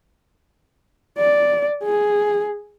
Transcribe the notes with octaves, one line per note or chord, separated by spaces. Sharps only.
D5
G#4